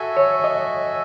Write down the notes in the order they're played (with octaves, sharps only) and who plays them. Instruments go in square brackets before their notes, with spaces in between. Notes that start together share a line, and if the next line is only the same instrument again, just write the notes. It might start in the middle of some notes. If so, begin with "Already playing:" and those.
Already playing: [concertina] F#4 A4 E5 G#5
[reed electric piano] C#5
D#5